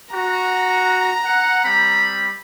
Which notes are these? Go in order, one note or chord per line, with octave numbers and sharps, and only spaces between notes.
F#4 A#5
F#5
G3 C4 B5